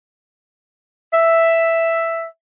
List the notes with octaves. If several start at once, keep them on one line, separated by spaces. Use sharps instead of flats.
E5